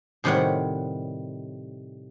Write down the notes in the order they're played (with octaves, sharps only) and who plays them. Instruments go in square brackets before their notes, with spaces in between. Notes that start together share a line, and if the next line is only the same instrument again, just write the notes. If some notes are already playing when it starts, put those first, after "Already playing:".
[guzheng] A2 C3 D#3 G3 C#5 F#5